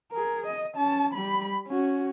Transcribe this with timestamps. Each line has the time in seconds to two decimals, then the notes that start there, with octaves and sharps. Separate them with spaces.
0.12 G#4 A#4
0.46 D#5
0.75 C#4 A5
1.14 G3 B5
1.67 C#4 F#4